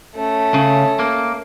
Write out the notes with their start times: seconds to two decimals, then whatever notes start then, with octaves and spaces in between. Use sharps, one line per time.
0.15 A3 C#4
0.54 C#3
0.99 A#3